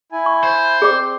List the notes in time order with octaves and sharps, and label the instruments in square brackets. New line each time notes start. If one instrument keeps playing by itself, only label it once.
[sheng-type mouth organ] E4 G#5
[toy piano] C#6
[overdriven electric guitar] C5
[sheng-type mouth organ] C4 [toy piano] G#4 D5 D6